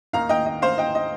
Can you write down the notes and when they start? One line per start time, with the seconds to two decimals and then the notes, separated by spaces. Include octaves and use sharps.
0.13 D#2 D#3 A#3 D#4 F5 A#5
0.29 D#5 G5
0.46 D#5
0.62 C5 F5
0.78 D#5 G5
0.95 D#5